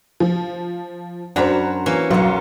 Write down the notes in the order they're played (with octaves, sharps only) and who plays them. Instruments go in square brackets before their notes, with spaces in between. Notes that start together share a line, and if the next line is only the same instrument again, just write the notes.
[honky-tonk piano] F3
[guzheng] F#2 A#5 B5 [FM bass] D4 [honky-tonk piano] F#4 C5
[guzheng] E3 A#3 C#4
[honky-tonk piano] B1 C#7 [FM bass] F#3 [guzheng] F4 F#5